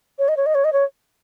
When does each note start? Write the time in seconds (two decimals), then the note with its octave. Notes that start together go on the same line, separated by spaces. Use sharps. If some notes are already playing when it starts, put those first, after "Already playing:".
0.19 C#5
0.28 D#5
0.37 C#5
0.46 D#5
0.55 C#5
0.64 D#5
0.73 C#5